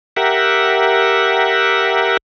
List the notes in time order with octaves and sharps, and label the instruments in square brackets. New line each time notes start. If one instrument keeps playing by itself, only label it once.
[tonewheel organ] G4 A#4 E5 F#5